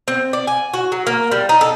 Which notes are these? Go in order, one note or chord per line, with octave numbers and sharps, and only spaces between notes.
C4
D5
G#5
F#4
F#3
A#3
G3
D#4
A4